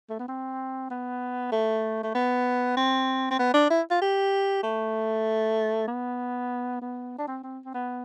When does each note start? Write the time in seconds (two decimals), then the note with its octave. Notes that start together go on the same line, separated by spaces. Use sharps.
0.10 A3
0.19 B3
0.28 C4
0.90 B3
1.52 A3
2.03 A3
2.15 B3
2.77 C4
3.31 C4
3.39 B3
3.54 D4
3.70 E4
3.91 F4
4.01 G4
4.63 A3
5.88 B3
6.81 B3
7.18 D4
7.27 C4
7.43 C4
7.65 C4
7.74 B3